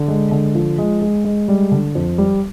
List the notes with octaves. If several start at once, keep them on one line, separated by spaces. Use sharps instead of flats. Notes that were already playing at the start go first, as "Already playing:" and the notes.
Already playing: D3
G#3
D3
F3
G#3
G#3
G#3
G3
D3
F2
G3